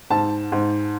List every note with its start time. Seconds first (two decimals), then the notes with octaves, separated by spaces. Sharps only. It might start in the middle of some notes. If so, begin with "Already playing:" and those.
0.10 G#2 A5
0.52 G#2